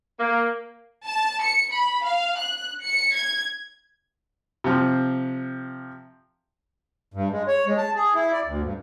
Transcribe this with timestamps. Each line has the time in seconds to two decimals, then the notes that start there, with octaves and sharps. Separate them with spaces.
0.19 A#3
1.06 A5
1.41 C#7
1.74 B5
2.06 F5
2.38 F#6
2.83 C#7
3.15 G#6
4.64 C3 F3
7.14 G2
7.31 G#3
7.48 C#5
7.66 G#3
7.78 A5
7.95 G#4
8.14 E4
8.31 D5
8.44 D2
8.62 G2